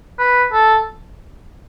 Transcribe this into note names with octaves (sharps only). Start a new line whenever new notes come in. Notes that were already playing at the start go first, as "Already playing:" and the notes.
B4
A4